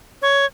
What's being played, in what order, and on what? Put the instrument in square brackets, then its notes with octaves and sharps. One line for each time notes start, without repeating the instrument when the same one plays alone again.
[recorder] C#5